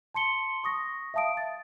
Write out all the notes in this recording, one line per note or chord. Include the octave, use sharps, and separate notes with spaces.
A5 C6 C#7 G7
C#6 D#6 A#6
E5 F5 A5 D#6 D7
A6